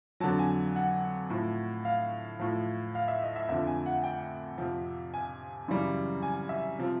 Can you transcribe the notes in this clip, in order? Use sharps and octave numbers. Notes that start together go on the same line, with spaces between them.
F2 D3 F#3 A5
G#5
F#5
A2 F3
F5
A2 F3
F5
E5
D#5
E5
F2 D3 F3 E5
G#5
F#5
G5
F2 C3 F3
G#5
F#2 C#3 E3 G3
G#5
E5
C3 F3